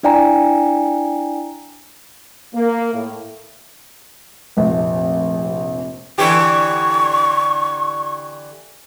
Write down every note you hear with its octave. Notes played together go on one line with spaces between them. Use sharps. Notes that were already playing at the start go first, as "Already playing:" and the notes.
D4 E4 D5 G5 G#5 A#5
A#3
A2
F1 A#1
D3 E3 G4 C#6